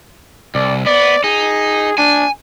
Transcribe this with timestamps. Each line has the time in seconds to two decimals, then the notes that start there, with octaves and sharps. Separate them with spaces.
0.55 C2 D5
0.86 B3 D5
1.24 D#4 G#4
1.98 D4 G#5